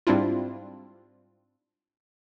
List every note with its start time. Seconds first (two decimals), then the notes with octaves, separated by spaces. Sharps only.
0.07 G#2 G3 C4 D4 E4 F4